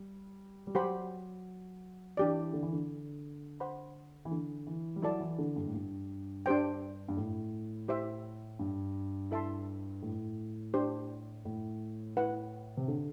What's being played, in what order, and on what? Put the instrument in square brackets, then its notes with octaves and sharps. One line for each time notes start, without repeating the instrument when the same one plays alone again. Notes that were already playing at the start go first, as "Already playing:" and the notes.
Already playing: [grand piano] G3
G3
[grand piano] F#3 [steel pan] G4 C5 F#5 B5
[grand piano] E3 [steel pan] D4 G4 D5
[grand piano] D3
E3
D3
[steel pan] C5 F#5 B5
[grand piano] E3
D3
E3
G3
[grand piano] F#3 [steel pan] E4 A4 D5 A5
[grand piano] E3
D3
G2
A2
G2
[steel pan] D4 G4 C5 G5
[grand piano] G2
A2
[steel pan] E4 G4 C5 E5
[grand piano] G2
[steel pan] E4 A4 E5 A5 C6
[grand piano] A2
[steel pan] D4 G4 C5
[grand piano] A2
[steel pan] E4 B4 F#5
[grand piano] C3
D3